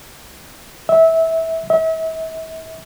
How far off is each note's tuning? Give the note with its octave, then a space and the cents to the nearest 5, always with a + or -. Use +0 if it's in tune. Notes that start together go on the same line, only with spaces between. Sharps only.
E5 -20
E5 -40